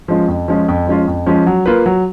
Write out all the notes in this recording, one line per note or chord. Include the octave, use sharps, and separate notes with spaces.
F3 G#3 C#4 F4
F2
F3 G#3 C#4 F4
F2
F3 G#3 C#4 F4
F2
F3 G#3 C#4 F4
F#3
A#3 F4 B4
F#3